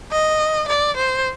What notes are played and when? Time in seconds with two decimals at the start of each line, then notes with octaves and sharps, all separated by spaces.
0.12 D#5
0.68 D5
0.97 C5